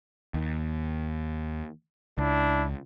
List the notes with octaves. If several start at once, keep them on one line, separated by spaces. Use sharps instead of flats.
D#2
C#2 D4 E4